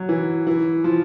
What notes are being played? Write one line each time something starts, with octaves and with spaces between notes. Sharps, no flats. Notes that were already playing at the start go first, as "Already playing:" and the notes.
Already playing: F#3
E3
E3
F3